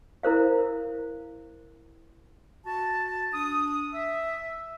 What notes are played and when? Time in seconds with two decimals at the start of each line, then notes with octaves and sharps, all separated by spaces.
0.23 E4 A#4 C5 F5
2.66 F#4 A5
3.32 D4 D#6
3.93 E5